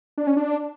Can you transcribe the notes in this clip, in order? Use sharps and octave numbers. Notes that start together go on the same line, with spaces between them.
D4
C#4
D4